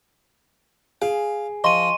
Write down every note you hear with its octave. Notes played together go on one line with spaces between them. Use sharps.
G#4 F5 G#5
F3 D#5 C6 C#6 D#7